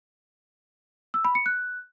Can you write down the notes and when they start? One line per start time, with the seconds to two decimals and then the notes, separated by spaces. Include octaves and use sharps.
1.14 E6
1.25 B5
1.35 C#7
1.46 F#6